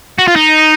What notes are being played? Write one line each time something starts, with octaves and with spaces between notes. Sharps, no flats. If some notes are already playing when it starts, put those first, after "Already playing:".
F#4
F4
D#4